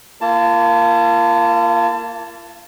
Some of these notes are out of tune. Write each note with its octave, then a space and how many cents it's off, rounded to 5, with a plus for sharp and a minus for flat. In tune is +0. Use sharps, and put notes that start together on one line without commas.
A#3 -10 F4 -45 A5 +15